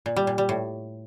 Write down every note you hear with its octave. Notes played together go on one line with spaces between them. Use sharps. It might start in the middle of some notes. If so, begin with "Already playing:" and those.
A#2
G3
A#2
G3
A2